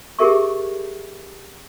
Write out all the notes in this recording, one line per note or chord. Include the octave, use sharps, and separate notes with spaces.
G4 G#4 A#4 E5 C#6